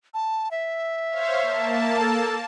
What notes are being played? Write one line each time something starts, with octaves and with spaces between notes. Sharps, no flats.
A5
E5
C5 C#5 F5
A#3 A5
A4